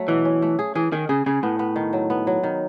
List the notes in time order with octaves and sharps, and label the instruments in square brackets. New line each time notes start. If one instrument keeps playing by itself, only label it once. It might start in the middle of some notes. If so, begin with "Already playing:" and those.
Already playing: [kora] F#3 A3
[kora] B2 [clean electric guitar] E3
[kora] C#4
A3
G#4
[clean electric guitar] E3 [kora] G#4
[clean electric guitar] D#3 [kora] G#4
[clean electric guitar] C#3 [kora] G#4
[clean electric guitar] C#3 [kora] G#4
[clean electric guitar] A2 [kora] B3
[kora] B3
D#3
F#3
B3
F#3
D#3